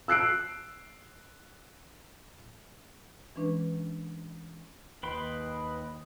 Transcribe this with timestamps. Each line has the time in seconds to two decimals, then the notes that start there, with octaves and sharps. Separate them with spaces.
0.08 E6 F#6 C7 D7
3.36 E3 G#3 C#4 D4 B4
5.03 D#2 B4 D#5 G5 B5 C6